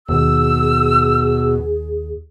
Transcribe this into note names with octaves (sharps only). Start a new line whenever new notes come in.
D#2 B2 G#4 E6